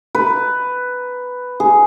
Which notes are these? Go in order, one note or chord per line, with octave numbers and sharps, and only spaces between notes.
B4
G#4